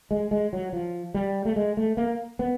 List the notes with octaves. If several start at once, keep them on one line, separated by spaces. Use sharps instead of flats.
G#3
G#3
F#3
F3
G3
A3
G#3
A3
A#3
B3